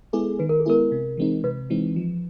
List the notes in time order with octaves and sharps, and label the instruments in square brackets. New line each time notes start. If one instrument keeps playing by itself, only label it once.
[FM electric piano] G#3 B3 E4 G#4 [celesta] A4
[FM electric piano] D#3 [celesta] B4
[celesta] A#4
A4
[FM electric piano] G#3 B3 E4 G#4 [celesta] A#4
[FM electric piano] C3
E3 G#3 C4 D#4
[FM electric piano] C3 [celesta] B4
[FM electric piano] E3 G#3 C4 D#4
F3